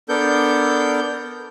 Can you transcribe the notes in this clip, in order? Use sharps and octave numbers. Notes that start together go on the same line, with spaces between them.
B3 D4 A4 A#4 G6